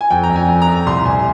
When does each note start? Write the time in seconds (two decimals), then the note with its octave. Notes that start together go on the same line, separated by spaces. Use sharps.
0.01 G#5
0.10 F2 G5
0.23 A#5
0.30 F2
0.36 G#5
0.48 F2
0.62 A#5
0.67 F2
0.86 C2 C6
1.05 C2 G#5